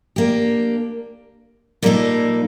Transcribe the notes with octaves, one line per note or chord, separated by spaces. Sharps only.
A#3 D4 G4
A#2 G3 A#3 D#4 A4